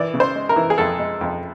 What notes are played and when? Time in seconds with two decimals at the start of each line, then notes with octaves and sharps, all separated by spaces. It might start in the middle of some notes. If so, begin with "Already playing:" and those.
Already playing: E3 D5
0.14 C#3
0.20 C5
0.35 G#3
0.49 A#4
0.56 E3
0.70 G#4
0.78 F2 A4
0.99 G#3
1.21 F2